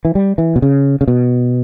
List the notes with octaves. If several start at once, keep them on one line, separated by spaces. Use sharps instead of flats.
E3
G3
E3
B2
C#3
C#3
B2